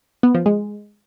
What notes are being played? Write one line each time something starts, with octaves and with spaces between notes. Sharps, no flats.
B3
F3
G#3